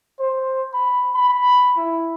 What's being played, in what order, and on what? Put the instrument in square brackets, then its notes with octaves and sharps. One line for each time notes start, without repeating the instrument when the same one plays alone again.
[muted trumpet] C5
B5
B5
E4